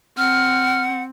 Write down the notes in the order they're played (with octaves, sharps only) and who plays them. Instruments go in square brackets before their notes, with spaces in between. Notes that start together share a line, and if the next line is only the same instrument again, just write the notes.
[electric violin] C4 [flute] F#5 [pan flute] F6